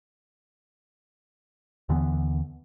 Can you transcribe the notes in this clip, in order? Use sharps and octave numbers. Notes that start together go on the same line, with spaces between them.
D#2 D3 E3 B3